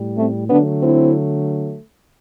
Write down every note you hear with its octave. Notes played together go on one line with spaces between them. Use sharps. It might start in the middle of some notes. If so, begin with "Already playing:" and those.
Already playing: A2 G3
A3 C4
D3 F#3 A3 B3 D4
C4 E4